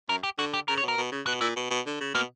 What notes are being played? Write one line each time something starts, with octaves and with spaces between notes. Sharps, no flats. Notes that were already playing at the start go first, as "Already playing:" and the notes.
F#2 A#4
G4
D3 F#4
G4
C#3 A#4
C#5
B2
A#4
B2
C#3
B2 F#4
A#2 E4
B2
B2
D3
C#3
B2 A#3